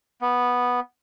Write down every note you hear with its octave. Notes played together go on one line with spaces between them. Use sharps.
B3